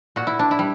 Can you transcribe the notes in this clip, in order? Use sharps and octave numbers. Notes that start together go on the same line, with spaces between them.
A#2 F#4
E4
D4
E4
G3